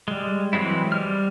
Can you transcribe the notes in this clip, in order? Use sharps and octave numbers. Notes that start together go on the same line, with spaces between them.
G3 G#3
E3 F#3 G#3 C4 E4
G3 F6